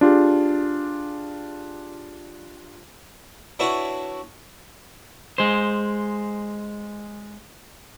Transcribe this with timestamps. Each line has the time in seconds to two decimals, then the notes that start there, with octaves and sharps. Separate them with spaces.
0.01 D4 F4 G4 G#4
3.59 D4 E4 F#4 B4 C#5
5.38 G#3 C5